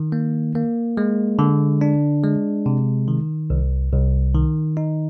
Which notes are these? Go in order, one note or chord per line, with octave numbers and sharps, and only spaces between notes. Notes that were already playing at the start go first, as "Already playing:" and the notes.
Already playing: D#3
A#3
A#3
G#3
D3
D4
G#3
C3
D#3
C2
C2
D#3
D#4